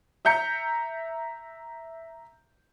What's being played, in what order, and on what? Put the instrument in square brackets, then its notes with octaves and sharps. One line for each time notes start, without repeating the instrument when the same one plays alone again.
[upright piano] E5 A#5 G6 C#7